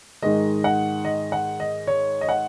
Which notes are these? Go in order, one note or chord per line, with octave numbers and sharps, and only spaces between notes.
G#2 D#3 G#3 D#5
F#5
D#5
F#5
D#5
C#5
D#5
F#5